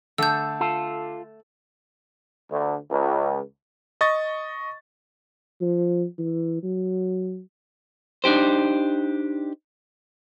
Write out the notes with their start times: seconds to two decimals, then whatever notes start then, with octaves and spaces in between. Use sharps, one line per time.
0.18 D3 A3 E6 G6
0.60 F4 A4
2.51 D2
2.91 C#2
4.01 D#5 C#6 A6
5.61 F3
6.18 E3
6.63 F#3
8.24 D4 D#4 G4 C5